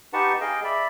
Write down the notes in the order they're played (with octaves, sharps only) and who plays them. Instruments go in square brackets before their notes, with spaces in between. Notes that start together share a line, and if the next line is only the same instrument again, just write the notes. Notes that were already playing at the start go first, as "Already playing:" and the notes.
[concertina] D#4 G4 B4 F#5 A5 C#6
G#4 D#5 F5 G5
D5 E5 B5